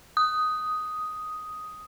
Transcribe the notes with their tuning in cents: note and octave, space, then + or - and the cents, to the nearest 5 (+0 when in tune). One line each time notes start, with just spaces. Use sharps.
D#6 +5